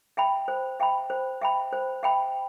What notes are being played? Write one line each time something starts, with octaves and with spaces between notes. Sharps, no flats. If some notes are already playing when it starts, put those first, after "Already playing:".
E5 G5 B5
C5
E5 G5 B5
C5
E5 G5 B5
C5
E5 G5 B5